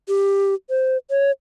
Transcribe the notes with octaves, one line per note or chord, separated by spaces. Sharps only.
G4
C5
C#5